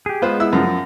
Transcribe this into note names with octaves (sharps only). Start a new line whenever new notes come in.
G4 G#4
G#3 B3 F4 B4 C5
E4 E6
F#2 F3